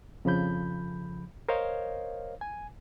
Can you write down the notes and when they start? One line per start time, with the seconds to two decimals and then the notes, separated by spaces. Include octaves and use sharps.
0.25 F2 C#3 F3 B5 G6
1.49 A#4 C5 C#5 D#5 F5
2.41 G#5